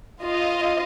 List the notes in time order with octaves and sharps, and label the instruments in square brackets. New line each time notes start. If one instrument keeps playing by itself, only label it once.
[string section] F4 D#5